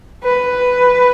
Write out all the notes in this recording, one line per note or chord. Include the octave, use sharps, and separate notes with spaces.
B4